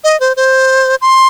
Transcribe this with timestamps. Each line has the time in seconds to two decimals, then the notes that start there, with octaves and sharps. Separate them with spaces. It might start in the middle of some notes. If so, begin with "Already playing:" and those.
0.04 D#5
0.20 C5
0.37 C5
1.01 C6